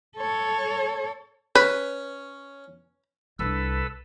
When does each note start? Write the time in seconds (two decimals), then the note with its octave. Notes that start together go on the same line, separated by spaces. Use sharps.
0.17 A4 C#5
1.55 C#4 B4
3.39 C2 D4 A4 B4 E6